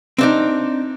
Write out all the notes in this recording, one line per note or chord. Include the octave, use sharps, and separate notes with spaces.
C4 D4 D#4